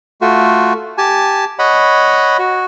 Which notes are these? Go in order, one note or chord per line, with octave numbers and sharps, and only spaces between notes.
A3 F4 F#4
G4 G#5 A5
C#5 D#5 F#5 B5
F#4